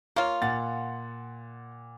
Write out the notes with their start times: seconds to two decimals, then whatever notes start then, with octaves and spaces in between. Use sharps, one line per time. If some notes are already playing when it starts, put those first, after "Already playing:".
0.16 A#3 F4 C#5 F5 A#5
0.42 A#2 F#5 A6